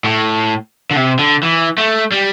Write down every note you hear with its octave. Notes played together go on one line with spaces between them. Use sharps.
A2
D3
C3
D3
E3
A3
G3